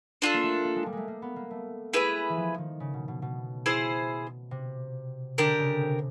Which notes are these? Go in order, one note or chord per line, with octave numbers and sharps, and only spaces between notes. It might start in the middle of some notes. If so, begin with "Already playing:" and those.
D4 F4 A4
A#3
A3
A#3
G#3
G3
G#3 A3
A#3
B3
A#3
A3
E4 G#4 B4 E5
E3
F3
D#3
C#3
B2
B2
B2
E4 G#4 C5
C3
D3 D4 G4 A#4
C#3
C3